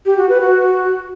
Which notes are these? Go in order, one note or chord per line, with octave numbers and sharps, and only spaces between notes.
G4
F#4
B4
F#4